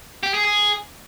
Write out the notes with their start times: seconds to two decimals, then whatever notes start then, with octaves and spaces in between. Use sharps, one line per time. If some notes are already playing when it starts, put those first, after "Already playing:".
0.23 G4
0.34 G#4
0.45 G#4